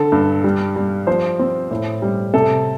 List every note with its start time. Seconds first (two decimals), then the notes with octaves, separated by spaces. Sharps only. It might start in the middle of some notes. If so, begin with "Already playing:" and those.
Already playing: D3 A4
0.12 G2
0.44 G3
0.76 G3
1.07 F3 C5
1.39 C4
1.70 A2
2.02 G3
2.34 C3 A4